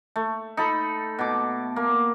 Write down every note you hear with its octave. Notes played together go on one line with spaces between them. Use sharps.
A3
D#4 A4 B5
B2 D6
A#3